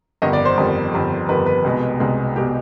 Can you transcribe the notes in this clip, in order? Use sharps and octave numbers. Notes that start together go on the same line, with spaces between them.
G1 F2 D#3 G3 D#5
D5
C5
G1 F2 D#3 G3
G1 F2 D#3 G3
G1 F2 D#3 G3 B4
B4
C2 B2 G#3
C2 B2 G#3
B2 G#3 G4